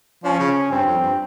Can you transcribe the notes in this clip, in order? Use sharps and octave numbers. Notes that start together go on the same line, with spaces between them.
F3 C#4
C#3
G2 C4
F2
G2